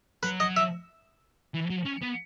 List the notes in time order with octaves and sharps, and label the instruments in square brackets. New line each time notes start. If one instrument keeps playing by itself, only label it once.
[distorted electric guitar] F#3 [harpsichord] B4
[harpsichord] D#5
E5
[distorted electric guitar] E3
F#3
C#4
B3